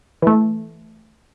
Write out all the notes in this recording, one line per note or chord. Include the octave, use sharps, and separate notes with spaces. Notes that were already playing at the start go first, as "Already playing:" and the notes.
E3 A3